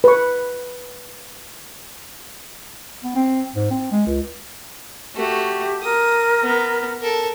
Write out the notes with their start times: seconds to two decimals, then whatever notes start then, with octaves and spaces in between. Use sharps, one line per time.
0.04 B4 C#6
3.03 B3
3.15 C4
3.56 G#2
3.71 C4
3.92 G#3
4.07 C#2
5.15 A3 F#4 G4
5.83 A#4 D#6
6.43 B3
7.01 A4 A#4